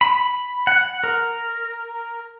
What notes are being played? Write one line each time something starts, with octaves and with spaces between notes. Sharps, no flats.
B5
F#5
A#4